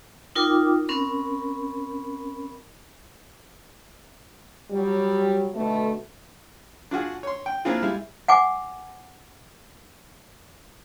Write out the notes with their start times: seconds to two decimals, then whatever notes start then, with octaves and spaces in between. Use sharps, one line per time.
0.35 D#4 F4 A#4 G5 D6
0.88 C4 C#4 A#4 B5
4.71 F#3 G3
5.54 B2 D3 A3
6.91 D4 F4 F#4 G#4
7.23 C#5 C6
7.46 G5
7.65 A#3 C4 D4 E4 F4 G#4
7.82 G3 G#3 E4 E5 F5
8.28 F#5 G#5 D6